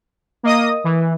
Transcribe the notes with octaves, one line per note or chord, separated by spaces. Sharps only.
A#3 D#5 D#6
E3